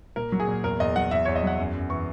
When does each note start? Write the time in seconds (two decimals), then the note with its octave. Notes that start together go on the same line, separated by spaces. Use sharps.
0.16 A#2 A#4
0.32 F#3
0.40 G#4
0.48 A#2
0.64 E2 A#4
0.80 E2 D#5
0.96 F#3 F#5
1.11 E2 E5
1.25 E2 C#5
1.36 D#5
1.43 F#3 F#5
1.59 F#2
1.75 F#2
1.90 E3 C#6